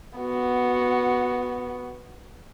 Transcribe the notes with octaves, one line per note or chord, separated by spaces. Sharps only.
B3 F#4